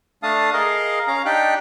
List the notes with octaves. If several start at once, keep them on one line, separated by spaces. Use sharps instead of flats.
A3 D4 F5 A5 D#6
G#4 A#4 D#5 F5
C#4 F5 A#5
D4 D#4 G4 G5 F#6